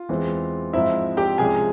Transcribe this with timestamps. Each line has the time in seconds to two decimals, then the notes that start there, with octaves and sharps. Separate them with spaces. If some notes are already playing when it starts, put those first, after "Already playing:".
Already playing: F4
0.09 E2 E3 G#3 C4
0.73 G#2 F3 G#3 C4 E4 E5
1.17 G4 G5
1.38 C2 C3 F3 G#3 C#4 G#4 G#5